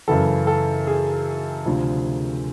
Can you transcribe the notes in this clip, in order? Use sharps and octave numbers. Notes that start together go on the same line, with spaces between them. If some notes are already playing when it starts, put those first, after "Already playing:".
F#2 C#3 E3 A4
A4
G#4
D2 C3 F3